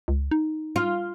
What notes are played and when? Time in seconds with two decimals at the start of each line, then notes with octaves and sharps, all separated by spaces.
0.08 C#2
0.31 D#4
0.76 F4